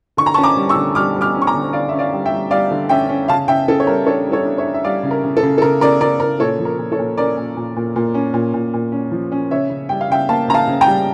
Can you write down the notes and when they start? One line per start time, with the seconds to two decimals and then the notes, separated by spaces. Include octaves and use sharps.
0.17 D3 C#6
0.26 A#5
0.34 A5 C#6
0.38 C#4
0.43 A#5 D6
0.57 G3
0.69 C#6 E6
0.76 D3
0.95 G3 D6 F6
1.16 G3
1.21 D6 F6
1.35 C#4
1.42 C#6
1.47 A#5 D6
1.54 D3
1.73 D3 D5 F5
1.89 C#4 E5
1.99 D5 F5
2.13 G3
2.26 E5 G5
2.32 G3
2.51 G3 D5 F5
2.71 D3
2.89 C#4 E5 G5
3.09 C#4
3.28 C#3 F5 A5
3.48 C#3 E5 G5
3.68 C#3 A4
3.80 C#5
3.87 G3 A#4
4.06 D4 A4 C#5
4.27 G3
4.32 A4 C#5
4.45 D4
4.58 C#5 E5
4.65 D4
4.74 E5
4.84 G3 D5 F5
5.03 C#3
5.11 A#4
5.24 C#3
5.37 A4
5.43 C#3
5.58 A4
5.62 C#3 A#4
5.81 C#3 A#4 D5
6.00 C#3 A#4 D5
6.20 C#3 A#4
6.40 A#2 A4 C#5
6.59 F3
6.65 A#4
6.78 A#2
6.92 A4 C#5
6.99 A#2
7.17 C#4 A#4 D5
7.37 A#2
7.57 A#2
7.76 A#2
7.96 A#2
8.14 C#4
8.34 A#2
8.54 A#2
8.74 A#2
8.92 C#4
9.12 F3
9.32 C#4
9.51 C#3 C#5 E5
9.70 C#3
9.89 G3 G5
10.01 F5
10.10 C#3 E5 G5
10.29 A#3 F5 A5
10.48 C#3 A#5
10.54 F5 A5
10.67 C#3
10.81 G5 A#5
10.86 G3